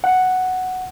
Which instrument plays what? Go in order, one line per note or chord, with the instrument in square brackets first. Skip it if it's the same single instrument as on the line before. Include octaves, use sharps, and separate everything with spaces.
[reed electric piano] F#5